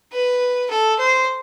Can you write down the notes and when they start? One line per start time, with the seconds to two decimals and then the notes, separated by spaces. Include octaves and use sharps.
0.13 B4
0.70 A4
0.99 C5